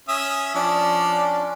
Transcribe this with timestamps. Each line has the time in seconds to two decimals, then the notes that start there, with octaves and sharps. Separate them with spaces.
0.09 C#4 E5 D#6
0.55 F3 C#4 D4 D5